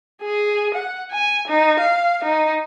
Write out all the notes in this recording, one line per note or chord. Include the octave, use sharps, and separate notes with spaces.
G#4
F#5
G#5
D#4
F5
D#4